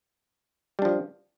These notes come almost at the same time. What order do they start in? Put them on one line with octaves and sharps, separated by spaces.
G3 D4 F3